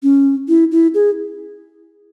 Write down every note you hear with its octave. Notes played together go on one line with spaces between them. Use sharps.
C#4
E4
E4
G#4